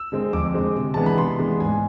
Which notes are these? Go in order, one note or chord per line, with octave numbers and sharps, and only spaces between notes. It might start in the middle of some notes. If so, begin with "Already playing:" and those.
Already playing: E6
D3 G#3 C4
F2 D6
D3 G#3 C4
C3
E3 G#3 B3 D4 A5
B5
C3 C6
E3 G#3 B3 D4
G#2 G#5